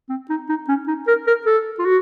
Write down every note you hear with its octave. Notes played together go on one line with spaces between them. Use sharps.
C4
D#4
D#4
C#4
D#4
A#4
A#4
A4
F4
F#4